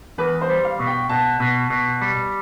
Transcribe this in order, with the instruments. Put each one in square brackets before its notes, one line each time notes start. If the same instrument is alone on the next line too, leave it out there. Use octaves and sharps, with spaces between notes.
[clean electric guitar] E2 [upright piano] B4
[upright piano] C5
[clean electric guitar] G3
[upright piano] F5
[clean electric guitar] B2
[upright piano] G5
[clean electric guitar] B2 [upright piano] A5
[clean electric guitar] B2
B2
G3